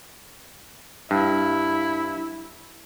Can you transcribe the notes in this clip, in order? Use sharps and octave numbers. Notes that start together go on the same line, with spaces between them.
G2 E4